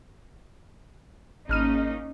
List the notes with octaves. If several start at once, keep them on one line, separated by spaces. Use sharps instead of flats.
G#1 A#3 C#4 D#4 F6 D#7